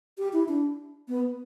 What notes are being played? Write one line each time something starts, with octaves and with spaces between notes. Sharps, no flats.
G4
E4
D4
B3